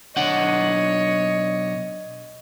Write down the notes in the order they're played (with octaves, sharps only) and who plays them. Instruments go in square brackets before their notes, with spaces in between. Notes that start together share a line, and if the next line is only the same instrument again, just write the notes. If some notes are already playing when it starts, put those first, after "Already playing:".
[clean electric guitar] B1 D4 F#5 [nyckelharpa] C#5 D#5